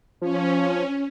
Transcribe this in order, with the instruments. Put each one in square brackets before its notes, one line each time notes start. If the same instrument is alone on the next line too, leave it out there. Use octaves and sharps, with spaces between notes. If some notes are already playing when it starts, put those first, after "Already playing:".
[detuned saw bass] F3 [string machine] C#4